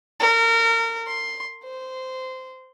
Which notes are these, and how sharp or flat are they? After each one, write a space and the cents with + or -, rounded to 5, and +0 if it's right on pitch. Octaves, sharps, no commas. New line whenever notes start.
A#4 -30
C6 +10
C5 -15